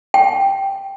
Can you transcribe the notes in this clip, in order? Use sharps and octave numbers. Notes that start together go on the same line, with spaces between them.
G5